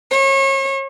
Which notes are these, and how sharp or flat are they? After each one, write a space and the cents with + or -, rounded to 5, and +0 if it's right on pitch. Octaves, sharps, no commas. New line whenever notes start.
C#5 -35